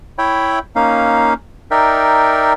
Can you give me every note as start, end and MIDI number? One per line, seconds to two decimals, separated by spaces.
0.18 0.59 64
0.18 0.59 73
0.18 0.59 76
0.18 0.59 79
0.18 0.59 83
0.76 1.34 58
0.76 1.34 61
0.76 1.34 63
0.76 1.34 77
1.71 2.53 63
1.71 2.53 70
1.71 2.53 74
1.71 2.53 76
1.71 2.53 79